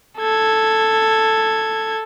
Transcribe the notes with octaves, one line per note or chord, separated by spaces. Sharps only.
A4 G#6